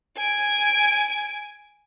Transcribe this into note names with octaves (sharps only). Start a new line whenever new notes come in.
G#5 D7